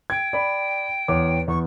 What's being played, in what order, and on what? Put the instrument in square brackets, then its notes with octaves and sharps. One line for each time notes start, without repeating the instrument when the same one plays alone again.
[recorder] G5 [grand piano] G#6
[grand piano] D5 B5
E2 C#5 D6
[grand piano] E2 [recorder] C#6